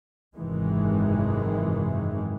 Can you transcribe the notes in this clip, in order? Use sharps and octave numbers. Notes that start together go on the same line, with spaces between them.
G#1 F#2 C3 D#3 E3 G#3